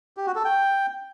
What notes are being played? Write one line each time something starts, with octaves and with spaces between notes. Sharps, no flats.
G4
F#4
A4
G5